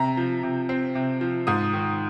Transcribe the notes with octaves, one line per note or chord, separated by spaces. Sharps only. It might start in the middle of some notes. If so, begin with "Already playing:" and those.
Already playing: C3 A#5
F3
C3
C4
C3
F3
G#2 D#6
D#3